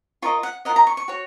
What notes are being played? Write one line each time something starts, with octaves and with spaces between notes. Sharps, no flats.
F4 A#4 D#5 C#6
F#5
F4 A#4 D#5 F#5
A#5
C#6
C#6
F#4 C#5